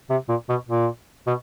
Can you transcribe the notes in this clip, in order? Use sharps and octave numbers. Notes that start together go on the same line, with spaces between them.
C3
A#2
B2
A#2
B2